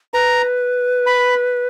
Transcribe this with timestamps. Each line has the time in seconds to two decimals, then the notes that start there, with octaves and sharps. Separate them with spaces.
0.13 B4 A#5
1.06 B5